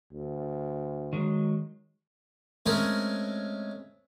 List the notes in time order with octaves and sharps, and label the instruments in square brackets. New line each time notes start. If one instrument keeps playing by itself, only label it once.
[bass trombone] D2
[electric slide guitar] D#3 F#3 G#3
[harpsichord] G#3 A3 C4 C#4 A#4 C5